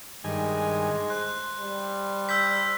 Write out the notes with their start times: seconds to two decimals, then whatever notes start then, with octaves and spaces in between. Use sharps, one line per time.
0.24 G2 D#3 G#3 G#5
1.10 C5 F#6
1.58 G3
2.29 E6 G6 B6